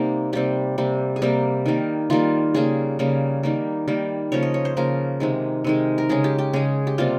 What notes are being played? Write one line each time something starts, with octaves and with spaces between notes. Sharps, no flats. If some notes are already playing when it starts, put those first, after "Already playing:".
Already playing: C3 G3 A#3 D#4
C3 G3 A#3 G4
C3 G3 A#3
G#4
C3 G3 A#3 G4
D#3 G3 A#3
D#3 G3 A#3 F4
C#3 G3 A#3 G#4
C#3 G3 A#3
D#3 G3 A#3
D#3 G3 A#3
C#3 F3 A#3 C#5
D#5
C#5
C5
C#3 F3 A#3 A#4
C3 D#3 G#3
C3 D#3 G#3
A#4
C#3 G#3 G#4
G4
G4
C#3 G#3 G#4
G4
C3 G3 A#3 F4